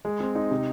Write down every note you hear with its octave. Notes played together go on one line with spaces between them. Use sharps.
G#3
C4
D#4
C3